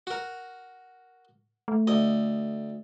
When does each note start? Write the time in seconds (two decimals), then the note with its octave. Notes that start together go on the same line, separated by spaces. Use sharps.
0.07 F#4 A#4
1.68 A3
1.87 D2 D#5